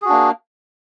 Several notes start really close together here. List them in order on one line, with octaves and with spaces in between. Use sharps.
G#4 F#4 D4 A#3